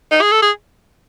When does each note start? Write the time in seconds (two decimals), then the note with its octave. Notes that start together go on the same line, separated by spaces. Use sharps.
0.11 D#4
0.21 G#4
0.32 A4
0.42 G#4